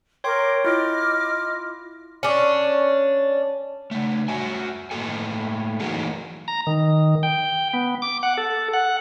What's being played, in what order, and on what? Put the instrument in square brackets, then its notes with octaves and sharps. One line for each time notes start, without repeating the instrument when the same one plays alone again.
[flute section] A#4 D6 [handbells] C#5 G5 C6
[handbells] E4 F4 [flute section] D#5 D6 F6
[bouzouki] C#4 D4
[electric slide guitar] C#3 A3
F#4 E5 G#5
A2 A#3 A4 G#5
E3 F#3 A#3 D#4 F#4 G#4
[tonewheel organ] A#5
D#3
G5
B3
D6
F#5
A4
F#5